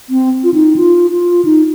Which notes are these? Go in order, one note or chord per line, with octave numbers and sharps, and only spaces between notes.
C4
F4
D#4
F4
F4
D#4